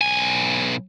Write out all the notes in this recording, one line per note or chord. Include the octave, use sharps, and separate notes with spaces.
B1 G#5